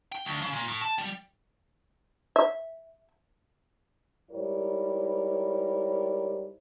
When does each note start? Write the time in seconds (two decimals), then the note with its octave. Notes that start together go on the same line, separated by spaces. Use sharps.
0.12 G5
0.25 D2
0.42 C#3
0.53 A#2
0.68 A2
0.82 A5
0.98 G3
2.36 E5
4.31 G#2 G3 E4 A#4 C5 C#5